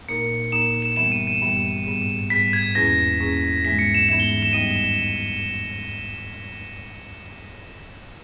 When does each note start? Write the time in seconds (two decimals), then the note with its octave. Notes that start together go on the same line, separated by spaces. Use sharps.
0.08 A#2 A#3 D#4 A#4 C#7
0.52 A#2 A#3 D#4 A#4 E7
0.82 E7
0.96 G2 E3 G3 B3 E7
1.12 D#7
1.27 D#7
1.42 G2 E3 G3 B3
1.86 G#2 G3 B3
2.30 G#2 G3 B3 B6
2.53 G#6
2.75 E2 B2 A#3 C#4 G#4 A#6
3.19 E2 B2 A#3 C#4 G#4
3.64 G#2 E3 G#3 B3 D#4 B6
3.79 C#7
3.94 E7
4.09 G#2 E3 G#3 B3 D#4 E7
4.20 G7
4.42 E7
4.53 G2 D#3 G3 B3 D#4 D#7